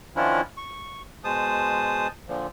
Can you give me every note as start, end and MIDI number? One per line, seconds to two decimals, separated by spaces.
0.16 0.41 51
0.16 0.41 53
0.16 0.41 61
0.16 0.41 62
0.16 0.41 64
0.16 0.41 65
0.57 1.02 85
1.24 2.07 47
1.24 2.07 56
1.24 2.07 72
1.24 2.07 81
1.24 2.07 87
2.28 2.47 46
2.28 2.47 50
2.28 2.47 53